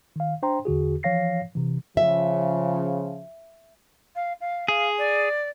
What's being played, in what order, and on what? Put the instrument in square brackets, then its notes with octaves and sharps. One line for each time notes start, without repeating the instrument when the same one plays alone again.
[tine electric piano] D#3 F5
D4 C5 G5 A#5 C6
E2 D3 F#4 G#4
E3 F3 C#5 F5 A#6 C7
C3 E3
[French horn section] C#3 F3 [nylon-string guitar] E5
[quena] F5
F5
[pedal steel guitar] G#4 [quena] F5
[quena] D5